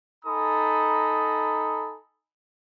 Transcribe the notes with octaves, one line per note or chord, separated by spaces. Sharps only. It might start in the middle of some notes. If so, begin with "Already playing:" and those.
D#4 A4 G#5 A#5 B5 D#6